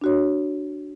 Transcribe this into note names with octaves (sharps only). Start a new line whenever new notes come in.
D4 F#4 C#5